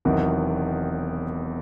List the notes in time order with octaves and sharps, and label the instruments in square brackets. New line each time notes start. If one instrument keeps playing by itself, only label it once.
[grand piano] E1 E2 C3 D#3 F#3